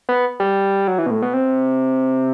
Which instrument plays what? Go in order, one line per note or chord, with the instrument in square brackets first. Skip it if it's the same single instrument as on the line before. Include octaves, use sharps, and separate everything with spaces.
[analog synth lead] B3
G3
F#3
E3
B2
A2
B2
C3